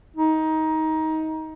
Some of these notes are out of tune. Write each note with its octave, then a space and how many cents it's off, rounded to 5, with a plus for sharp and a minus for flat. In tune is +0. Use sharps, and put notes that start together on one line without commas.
D#4 +20